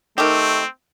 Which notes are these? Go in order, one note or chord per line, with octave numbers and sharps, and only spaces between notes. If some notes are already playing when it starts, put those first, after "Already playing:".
D#3 A3 C4 G4